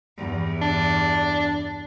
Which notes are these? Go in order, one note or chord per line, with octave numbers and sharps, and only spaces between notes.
E2 G2
D4